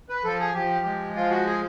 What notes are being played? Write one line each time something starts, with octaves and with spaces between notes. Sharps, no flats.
B4
F3 A4
G#4
F3 G4
G#3
F3 F4
F#4
G#4